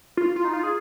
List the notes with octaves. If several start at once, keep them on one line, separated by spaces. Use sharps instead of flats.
F4
F4
D#4
F4
G#4